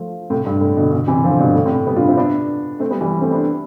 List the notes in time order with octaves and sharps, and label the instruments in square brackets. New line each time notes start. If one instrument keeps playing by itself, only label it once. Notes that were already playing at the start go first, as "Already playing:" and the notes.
Already playing: [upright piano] F3 A3
A2 C3
G2
A2
B2 D3
B2 D3
C3 E3
D3 F3
G2 B2
A2
A2 C3
G3 B3
D4 F4
C4 E4
B3 D4
A3 C4
G3 B3
E3 G3
A3 C4
B3 D4